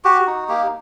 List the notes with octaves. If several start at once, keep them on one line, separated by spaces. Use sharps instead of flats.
F#4 G4
D#4
A#3 G4